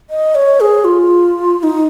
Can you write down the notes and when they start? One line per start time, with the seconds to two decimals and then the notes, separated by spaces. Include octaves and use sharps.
0.10 D#5
0.35 C#5
0.60 G#4
0.85 F4
1.59 F4
1.63 D#4